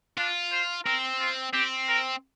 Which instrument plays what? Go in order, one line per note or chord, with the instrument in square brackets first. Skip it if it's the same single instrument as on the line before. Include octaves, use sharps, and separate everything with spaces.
[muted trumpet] D4 [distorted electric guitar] F4
[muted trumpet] C5
[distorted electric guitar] C4 [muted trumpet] A#4
[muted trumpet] F4
[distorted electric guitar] C4 [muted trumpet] G4
[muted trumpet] A#4